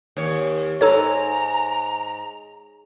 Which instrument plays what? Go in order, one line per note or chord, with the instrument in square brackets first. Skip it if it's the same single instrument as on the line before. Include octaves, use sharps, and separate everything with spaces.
[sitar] D#2 C#5
[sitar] G#2 [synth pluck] D#4 A4 C#5 [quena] A#5